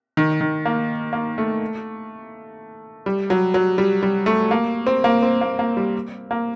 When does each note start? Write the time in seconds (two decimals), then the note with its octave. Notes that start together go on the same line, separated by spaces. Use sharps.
0.17 D#3
0.41 D#3
0.65 A#3
1.13 A#3
1.38 A3
3.06 G3
3.30 F#3
3.54 F#3
3.78 G3
4.03 G3
4.26 A3
4.51 A#3
4.87 C4
5.04 A#3
5.22 C4
5.41 A#3
5.59 A#3
5.77 G3
6.31 A#3